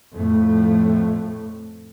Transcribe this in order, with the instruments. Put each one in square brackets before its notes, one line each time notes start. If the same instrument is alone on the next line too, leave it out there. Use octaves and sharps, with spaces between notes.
[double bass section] F2 A2 A3